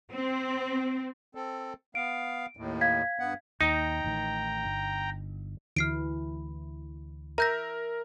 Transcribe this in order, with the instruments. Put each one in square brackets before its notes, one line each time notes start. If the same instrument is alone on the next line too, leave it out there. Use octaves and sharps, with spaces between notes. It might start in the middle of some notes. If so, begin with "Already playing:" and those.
[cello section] C4
[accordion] C4 A4
[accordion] B3 F5 [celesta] D7
[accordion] D#2 A2
[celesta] F5 G#6 B6
[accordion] G2 B3 F#5
[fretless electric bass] D#2 [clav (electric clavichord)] D#4 [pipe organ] G5 A#5
[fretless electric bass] A1 A2 D#3
G1
[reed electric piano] D2 [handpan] E3 E4 [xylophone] F6 C7 D7
[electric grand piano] A#4 [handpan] E5 [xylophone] A#5 G6 A#6